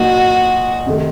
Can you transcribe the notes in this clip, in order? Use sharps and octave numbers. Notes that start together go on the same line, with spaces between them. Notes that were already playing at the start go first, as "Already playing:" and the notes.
Already playing: A#2 F#3 A#3 D#4 F#4
C3 D#3 A3